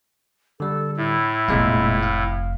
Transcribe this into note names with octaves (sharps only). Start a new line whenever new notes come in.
D3 G3 A4
A2 E4
F1 A#2 G#3 F4 F5
F5